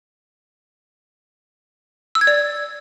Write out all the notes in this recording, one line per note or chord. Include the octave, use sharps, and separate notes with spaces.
E6
G#6
D5